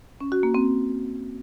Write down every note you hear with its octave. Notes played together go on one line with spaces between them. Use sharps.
C#4
F#4
A#3
C4